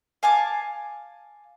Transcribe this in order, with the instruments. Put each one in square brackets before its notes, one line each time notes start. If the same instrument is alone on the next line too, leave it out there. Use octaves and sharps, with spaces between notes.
[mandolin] F5 G#5 A5 D6